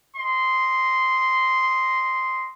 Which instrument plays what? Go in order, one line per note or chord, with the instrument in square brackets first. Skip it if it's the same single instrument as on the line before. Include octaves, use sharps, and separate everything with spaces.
[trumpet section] D#5 C6